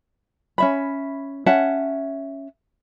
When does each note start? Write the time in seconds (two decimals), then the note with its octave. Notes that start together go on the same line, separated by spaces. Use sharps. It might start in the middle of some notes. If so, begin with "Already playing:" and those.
0.58 C#4 E5 B5
1.46 C#4 E5 F#5 A5